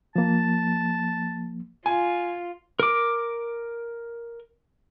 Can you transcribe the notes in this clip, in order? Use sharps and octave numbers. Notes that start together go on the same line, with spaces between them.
F3 A#3 A5
F4 G#5
A#4 D6